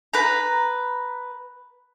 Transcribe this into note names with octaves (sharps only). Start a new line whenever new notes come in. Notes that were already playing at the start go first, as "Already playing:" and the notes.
B4 A#5